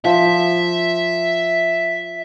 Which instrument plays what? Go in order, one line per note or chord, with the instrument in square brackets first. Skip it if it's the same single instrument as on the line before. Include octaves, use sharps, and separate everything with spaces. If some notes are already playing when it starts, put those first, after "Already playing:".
[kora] F3 [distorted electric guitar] E5